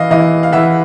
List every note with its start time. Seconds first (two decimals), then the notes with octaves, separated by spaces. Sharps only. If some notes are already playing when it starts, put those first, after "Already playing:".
Already playing: E3 D#5 F5
0.10 E3 D#5 F5
0.43 F5
0.52 E3 E5 F#5